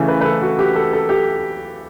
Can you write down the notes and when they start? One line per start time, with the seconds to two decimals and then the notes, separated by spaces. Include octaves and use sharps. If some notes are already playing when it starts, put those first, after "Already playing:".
Already playing: C#3 E3 A3 E4
0.08 B4
0.21 B4
0.25 A4
0.41 F#4
0.59 G4
0.76 A4
0.93 A4
1.09 G4